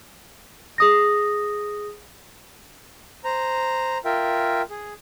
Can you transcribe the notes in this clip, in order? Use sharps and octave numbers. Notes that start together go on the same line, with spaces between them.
G#4 D#6 A#6
C5 A#5
F4 A#4 E5 G5
G#4